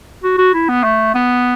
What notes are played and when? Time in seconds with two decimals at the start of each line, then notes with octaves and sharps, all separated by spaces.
0.23 F#4
0.38 F#4
0.54 E4
0.69 B3
0.83 A3
1.14 B3